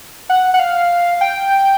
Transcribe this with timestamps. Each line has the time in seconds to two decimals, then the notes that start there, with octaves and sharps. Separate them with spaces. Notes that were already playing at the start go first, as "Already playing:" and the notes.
0.29 F#5
0.54 F#5
0.59 F5
1.21 G5